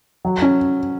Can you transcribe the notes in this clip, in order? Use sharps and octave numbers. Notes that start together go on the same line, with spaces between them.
F#3
C#4